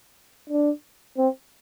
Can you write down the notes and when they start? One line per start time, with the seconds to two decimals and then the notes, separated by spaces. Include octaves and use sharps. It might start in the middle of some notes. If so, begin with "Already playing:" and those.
0.50 D4
1.18 C4